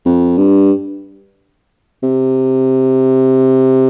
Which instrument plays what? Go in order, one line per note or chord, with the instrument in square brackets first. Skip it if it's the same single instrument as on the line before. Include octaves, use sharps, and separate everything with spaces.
[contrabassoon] F2
G2
C3